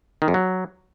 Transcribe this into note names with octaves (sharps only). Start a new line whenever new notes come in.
D#3
F2
F#3